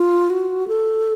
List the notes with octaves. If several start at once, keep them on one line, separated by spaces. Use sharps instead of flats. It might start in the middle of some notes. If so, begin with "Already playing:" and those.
Already playing: F4
F#4
A4